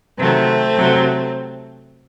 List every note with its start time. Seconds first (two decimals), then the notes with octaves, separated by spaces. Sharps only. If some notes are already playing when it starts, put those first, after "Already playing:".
0.18 C3 D#3 F#3 A3 C4
0.78 C3 F#3